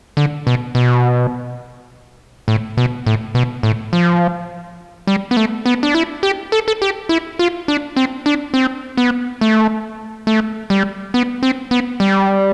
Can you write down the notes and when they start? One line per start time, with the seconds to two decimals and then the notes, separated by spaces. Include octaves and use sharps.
0.17 D3
0.47 B2
0.75 B2
2.48 A2
2.77 B2
3.06 A2
3.35 B2
3.63 A2
3.93 F3
5.07 G3
5.31 B3
5.37 A3
5.66 B3
5.83 D4
5.95 E4
6.23 G4
6.52 A4
6.68 A4
6.82 G4
7.09 E4
7.39 F4
7.68 D4
7.96 C4
8.26 D4
8.54 C4
8.97 B3
9.41 A3
10.27 A3
10.70 G3
11.14 B3
11.43 C4
11.71 B3
12.00 G3